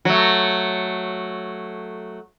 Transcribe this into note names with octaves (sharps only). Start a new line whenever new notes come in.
F#3 A3